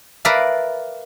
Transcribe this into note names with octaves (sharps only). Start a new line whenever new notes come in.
A#4 B4 D5 E5 F5 A5